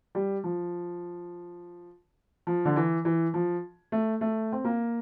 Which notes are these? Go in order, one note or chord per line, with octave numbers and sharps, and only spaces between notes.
G3
F3
F3
D3
E3
E3
F3
A3
A3
C4
A#3